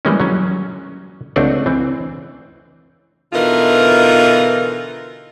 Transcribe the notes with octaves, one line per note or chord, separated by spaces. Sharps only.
E3 G3 G#3 A#3 C#4
F#3 C#4
C#2 A3 C4 D4 F#5
E3 C4
B2 D3 E3 D#4 F4 A#4